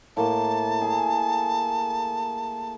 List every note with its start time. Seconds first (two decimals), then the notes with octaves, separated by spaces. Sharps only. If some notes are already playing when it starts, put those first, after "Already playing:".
0.17 A2 A#3 A5 C6
0.82 G#4 E5